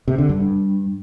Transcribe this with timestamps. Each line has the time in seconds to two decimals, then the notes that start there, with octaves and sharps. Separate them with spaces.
0.08 C3
0.18 D3
0.29 G2